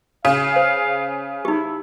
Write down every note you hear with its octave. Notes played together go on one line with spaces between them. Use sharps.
C#3 F5
C5
D#4 E4 G4